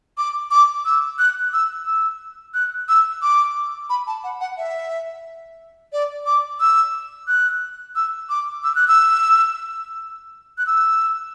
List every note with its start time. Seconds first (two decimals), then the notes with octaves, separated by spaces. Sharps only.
0.18 D6
0.51 D6
0.85 E6
1.19 F#6
1.53 E6
1.86 E6
2.54 F#6
2.89 E6
3.22 D6
3.90 B5
4.07 A5
4.24 F#5
4.41 F#5
4.57 E5
5.93 D5
6.26 D6
6.60 E6
7.28 F#6
7.96 E6
8.30 D6
8.64 E6
8.75 F#6
8.88 E6
10.58 F#6
10.67 E6